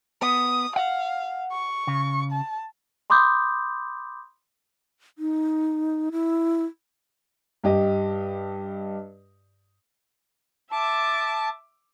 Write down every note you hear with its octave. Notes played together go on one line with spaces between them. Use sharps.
B3 D#6
F5 F#5
C#6
C#3
A5
B5 C6 D6 D#6 G6
D#4
E4
G2 G4 D#5
E5 A5 D6